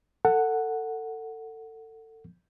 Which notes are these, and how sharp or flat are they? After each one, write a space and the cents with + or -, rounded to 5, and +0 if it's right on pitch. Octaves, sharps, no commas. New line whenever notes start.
A4 +25 F#5 +0